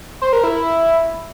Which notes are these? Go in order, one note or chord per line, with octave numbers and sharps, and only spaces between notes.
C5
A#4
E4